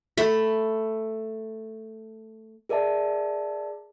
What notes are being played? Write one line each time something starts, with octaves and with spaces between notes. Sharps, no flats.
A3 B5
G#4 A#4 D5 E5 A5